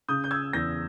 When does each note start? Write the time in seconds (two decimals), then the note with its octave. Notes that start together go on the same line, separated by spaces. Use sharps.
0.08 C#3 D#6 G6
0.24 G6
0.31 E6 G#6
0.53 E2 G6 A#6